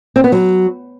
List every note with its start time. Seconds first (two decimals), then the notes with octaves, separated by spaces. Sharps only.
0.16 C4
0.24 B3
0.32 F#3